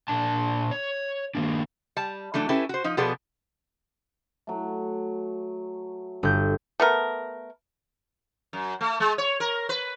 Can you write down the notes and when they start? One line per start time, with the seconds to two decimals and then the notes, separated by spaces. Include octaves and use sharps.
0.08 A#2 D4 A5
0.71 C#5
1.35 D#3 E3 A#3 D4
1.97 G3 A5
2.34 E3 F#3 A3 D4
2.49 C#4 E4 G4 A4 B4
2.69 F#4 C5
2.84 F3 D#4
2.97 B2 F3 B3 G#4 A4 D5
4.47 F#3 A3
6.23 G1 G6
6.80 A3 B3 A#4
8.53 F#2
8.81 A3
9.00 G#3
9.18 C#5
9.40 A#4
9.69 B4